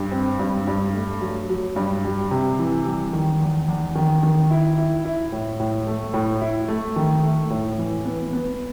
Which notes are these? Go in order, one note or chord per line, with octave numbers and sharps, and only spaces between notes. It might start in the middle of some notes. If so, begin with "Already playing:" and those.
Already playing: G2
C4
G2
G2
A3
F#3
F#3
G2
G3
C3
E3
G3
D#3
E2
E2
D#3
D#3
E4
E4
E4
A2
A2
A3
A2
E4
A3
D#3
A3
A2
E3
B3
B3